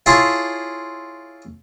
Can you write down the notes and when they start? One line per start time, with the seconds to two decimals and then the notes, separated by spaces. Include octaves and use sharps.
0.06 E4 F4 G#4 C#5 E5 A5